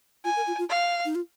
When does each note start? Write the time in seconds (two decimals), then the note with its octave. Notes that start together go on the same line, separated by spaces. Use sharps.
0.24 F4 G#5
0.36 A#4
0.47 F4
0.58 F4
0.70 F5
1.05 D#4
1.15 F4